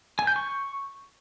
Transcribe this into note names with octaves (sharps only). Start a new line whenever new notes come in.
G#5
G6
C#6